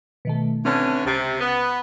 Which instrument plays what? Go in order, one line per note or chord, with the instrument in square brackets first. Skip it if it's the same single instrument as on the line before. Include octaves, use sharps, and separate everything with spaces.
[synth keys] B2 D#3 A3
[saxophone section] D3 E3 C#4 [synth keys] C4 A5
[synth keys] C#2 A6 [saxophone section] C3
[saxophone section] B3